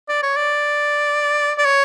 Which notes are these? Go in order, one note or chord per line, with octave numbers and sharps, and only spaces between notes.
D5
C#5
D5
D5
C#5